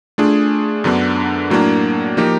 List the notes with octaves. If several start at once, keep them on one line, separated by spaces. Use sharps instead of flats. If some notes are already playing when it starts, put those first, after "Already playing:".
A3 D4 F4 G#4
F#2 D3 F#3 B3 D4
A2 F#3 A#3 D4
F3 A#3 D#4 G4